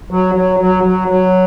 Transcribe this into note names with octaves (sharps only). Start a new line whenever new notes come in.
F#3
F#3
F#3
F#3
F#3